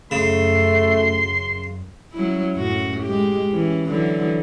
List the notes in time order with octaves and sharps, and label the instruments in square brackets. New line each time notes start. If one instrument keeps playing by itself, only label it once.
[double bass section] F#2 [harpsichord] C#3 [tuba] A3 [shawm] C6
[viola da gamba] F#3 C#4 E4
F#2 A2 F#4
G#3 G4
E3 C#4
D3 E3 F#3